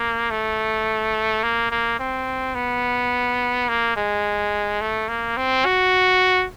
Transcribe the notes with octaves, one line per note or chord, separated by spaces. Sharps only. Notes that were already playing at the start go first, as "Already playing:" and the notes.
Already playing: A#3
A3
A#3
A#3
C4
B3
A#3
G#3
A3
A#3
C4
F#4